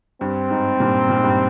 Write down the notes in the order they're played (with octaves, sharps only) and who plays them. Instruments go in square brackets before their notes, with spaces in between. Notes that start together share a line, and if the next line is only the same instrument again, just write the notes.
[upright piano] G2 [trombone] C4
[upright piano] G#2
G2 A#2
A#2
G#2
G2